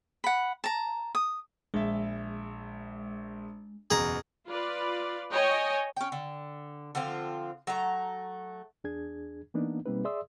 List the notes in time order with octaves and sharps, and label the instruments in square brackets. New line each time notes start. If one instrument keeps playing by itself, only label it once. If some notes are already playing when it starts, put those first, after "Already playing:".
[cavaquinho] F#5 B5
A5 A#5
D#6
[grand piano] A#1 E5 [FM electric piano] G#3
[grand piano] F#1 E2 B2 [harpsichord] G#4 A#5
[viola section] F4 B4 D5
C#5 D#5 G5 G#5
[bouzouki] C#4 G5
D3
D3 F3 C4 F4
F#3 A3 A#5
[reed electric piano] E2 D4 G#4 G#6
E3 A#3 B3 D4 D#4
B2 G3 A#3 C4 D#4 B4
G#4 D5 E5 C6 D#6 E6